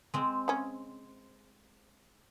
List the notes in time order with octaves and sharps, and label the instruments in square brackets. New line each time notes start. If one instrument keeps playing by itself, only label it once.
[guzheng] G#3 C4
[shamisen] C#3 C#4